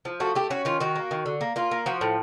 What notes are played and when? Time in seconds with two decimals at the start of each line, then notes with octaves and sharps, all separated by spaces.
0.05 F3
0.20 A3 F#4
0.35 A3 G4
0.50 C#4 F#4
0.65 D#3 F4
0.80 D#3 F#4
0.96 A#3
1.11 D#3
1.26 D3
1.41 A#3
1.56 A#3 F4
1.71 A#3
1.86 F3 F#4
2.01 A2